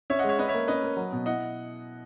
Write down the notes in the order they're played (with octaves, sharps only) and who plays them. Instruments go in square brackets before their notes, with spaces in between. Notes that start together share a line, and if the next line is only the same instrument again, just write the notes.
[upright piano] C#4 [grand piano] C#5 E5
[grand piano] D#5 F#5
[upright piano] G#3
[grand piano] C#5 E5
[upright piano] C#4 [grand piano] B4 D#5
[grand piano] C#5 E5
[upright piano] A#3
[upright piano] C#4 [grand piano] B4 D#5
[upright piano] A#3
F#3
B2
[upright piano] E4 [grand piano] D#5 F#5